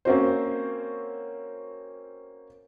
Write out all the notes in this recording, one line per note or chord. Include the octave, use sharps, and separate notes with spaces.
A#3 C4 C#4 F#4 C5